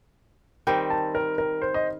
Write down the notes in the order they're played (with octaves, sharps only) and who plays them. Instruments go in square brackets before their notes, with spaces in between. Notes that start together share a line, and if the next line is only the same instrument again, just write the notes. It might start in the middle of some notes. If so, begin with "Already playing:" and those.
[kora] D#3 G3 C4 [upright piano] G5
[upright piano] A5
A#4
A#4
C5
D#5